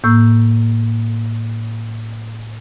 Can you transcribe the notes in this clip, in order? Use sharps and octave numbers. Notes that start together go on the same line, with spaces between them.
A2 A#3 C#6 E6 G6